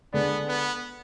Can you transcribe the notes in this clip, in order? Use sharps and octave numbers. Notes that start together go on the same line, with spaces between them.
D3 G#3 B3 D4
B3